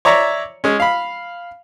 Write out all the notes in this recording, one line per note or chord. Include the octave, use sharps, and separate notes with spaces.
C#5 D5 E5 A#5 C#6
G#3 C#4
F5 B5